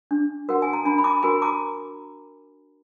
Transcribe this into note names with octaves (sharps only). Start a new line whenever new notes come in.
D4
F#4 A#4 F#5
G#5
A#5
D4 G#5 B5
B5
A#5 D6
F#4 A#4 G#5 B5
A#5 D6